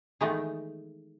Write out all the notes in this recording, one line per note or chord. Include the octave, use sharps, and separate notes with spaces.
D#3 E3 G#3 A3 B3 D#4